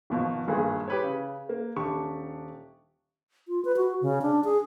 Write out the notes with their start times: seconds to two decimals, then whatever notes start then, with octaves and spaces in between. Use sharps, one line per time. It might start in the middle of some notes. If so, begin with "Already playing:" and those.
0.10 G#1 B2 F3
0.48 G#1 G2 A#2 A#3 G#4
0.88 G4 B4 C#5
1.03 C#3
1.49 A#3
1.76 D#1 D4 G4 C#6
3.48 F4
3.65 B4
3.77 F#4
4.01 C#3
4.22 D4
4.44 G#4